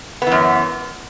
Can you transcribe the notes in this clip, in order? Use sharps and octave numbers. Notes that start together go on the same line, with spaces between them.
F#2 E3 B3